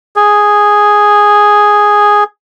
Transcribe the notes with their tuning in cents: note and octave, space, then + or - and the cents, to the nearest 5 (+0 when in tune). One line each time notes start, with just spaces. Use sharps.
G#4 -5